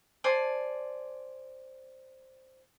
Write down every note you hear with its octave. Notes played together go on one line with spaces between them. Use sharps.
C5 D5 G#5 A5